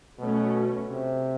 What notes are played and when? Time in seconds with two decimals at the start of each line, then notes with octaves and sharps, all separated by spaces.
0.19 B2 F#3 A3 C#4
0.88 C3